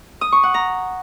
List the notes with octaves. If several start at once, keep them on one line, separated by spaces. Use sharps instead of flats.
D#6
C#6
F#5
A#5